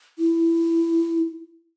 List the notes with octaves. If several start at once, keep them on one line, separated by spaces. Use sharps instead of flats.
E4